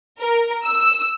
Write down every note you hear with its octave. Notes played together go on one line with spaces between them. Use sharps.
A#4
E6